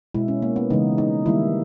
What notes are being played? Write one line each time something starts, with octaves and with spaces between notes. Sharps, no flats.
B2 G#3 E4
C#4
A#3
B3
C#3 E3 G#3 D#4
D#4
D#3 G3 A#3 E4